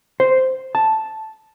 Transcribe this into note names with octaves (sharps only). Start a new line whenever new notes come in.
C5
A5